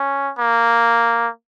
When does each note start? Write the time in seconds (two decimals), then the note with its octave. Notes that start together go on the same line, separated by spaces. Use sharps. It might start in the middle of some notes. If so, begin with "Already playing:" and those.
Already playing: C#4
0.39 A#3